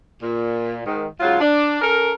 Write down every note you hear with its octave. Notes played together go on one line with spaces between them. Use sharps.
A#2
G#2 D#3
G#2 C#3 F#3 F4
D4
C#4 A4 A#4